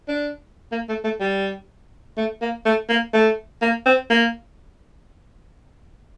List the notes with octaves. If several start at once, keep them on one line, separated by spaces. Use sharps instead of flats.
D4
A#3
A3
A3
G3
A3
A#3
A3
A#3
A3
A#3
C4
A#3